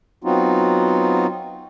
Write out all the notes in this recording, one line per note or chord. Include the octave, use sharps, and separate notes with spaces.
F#3 B3 C4 D#4 F4 F#4